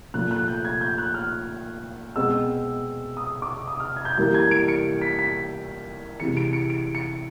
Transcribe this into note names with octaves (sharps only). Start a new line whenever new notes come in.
A#2 F3 A3 F#6
F#6
G6
G#6
G6
F#6
F6
B2 G#3 C4 E6
D#6
D6
D#6
F6
G#6
G6
E3 G3 A#3 G6
G#6
D7
C#7
B6
B6
C3 E3 G#3 C#7
D7
C#7
D7
C#7